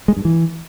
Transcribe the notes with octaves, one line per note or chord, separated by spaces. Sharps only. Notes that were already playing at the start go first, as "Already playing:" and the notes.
G#3
G2
E3